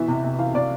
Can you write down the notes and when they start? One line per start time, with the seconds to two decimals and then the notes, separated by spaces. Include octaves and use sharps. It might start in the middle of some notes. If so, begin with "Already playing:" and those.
Already playing: B2 E3 E5
0.08 C3
0.24 C3
0.39 E3 F5
0.54 C3 D5